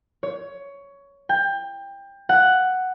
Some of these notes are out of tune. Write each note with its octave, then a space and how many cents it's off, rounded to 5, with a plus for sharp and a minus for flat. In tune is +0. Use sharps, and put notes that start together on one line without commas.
C#5 +15
G5 +20
F#5 +5